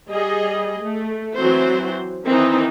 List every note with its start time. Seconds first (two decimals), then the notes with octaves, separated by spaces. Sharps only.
0.10 G3 G#4 D#5
0.83 A3
1.36 E3 F#3 C4 F#4 C5
2.26 D#3 E3 C4 D#4